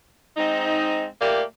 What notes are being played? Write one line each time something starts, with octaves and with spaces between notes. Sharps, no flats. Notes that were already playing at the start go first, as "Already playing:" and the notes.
G#2 C4 D#4
A#2 A3 A#3 G4 D5